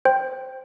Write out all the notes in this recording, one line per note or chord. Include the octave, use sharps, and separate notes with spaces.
C5 G5